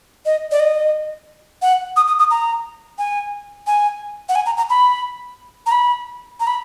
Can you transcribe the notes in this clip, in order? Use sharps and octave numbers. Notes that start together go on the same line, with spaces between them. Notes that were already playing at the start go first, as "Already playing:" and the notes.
D#5
D5
D#5
F#5
D#6
D#6
D#6
A#5
G#5
G#5
F#5
G#5
A#5
A#5
B5
A#5
B5
A#5
B5